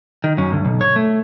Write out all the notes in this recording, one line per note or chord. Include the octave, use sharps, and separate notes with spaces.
D#3
F#2 C#4
D2 G2
B1
C#5
A3